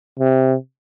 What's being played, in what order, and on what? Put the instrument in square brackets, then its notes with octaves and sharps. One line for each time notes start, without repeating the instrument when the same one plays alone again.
[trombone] C3